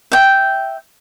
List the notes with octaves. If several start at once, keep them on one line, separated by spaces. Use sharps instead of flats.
E5 G5